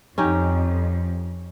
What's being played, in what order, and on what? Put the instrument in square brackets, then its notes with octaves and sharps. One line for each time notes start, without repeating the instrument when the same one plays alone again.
[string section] F2 [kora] C#4 D#4 G4